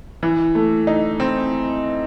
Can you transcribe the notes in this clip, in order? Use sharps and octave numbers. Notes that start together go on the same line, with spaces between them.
E3
A3
D#4
C4